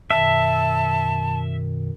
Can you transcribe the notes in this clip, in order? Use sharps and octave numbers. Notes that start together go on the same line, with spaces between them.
F#2 B2 D#3 E5 A5